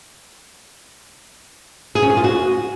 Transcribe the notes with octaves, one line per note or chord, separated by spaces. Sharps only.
G#4
C#4
G#4
F4
F#4